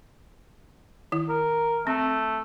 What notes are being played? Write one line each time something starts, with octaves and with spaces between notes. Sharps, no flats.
D#3 E4
A#4
A3 C4